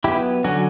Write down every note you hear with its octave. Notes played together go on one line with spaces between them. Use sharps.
F#3 B3 E4 G4
D3 F#3 C#4 F#4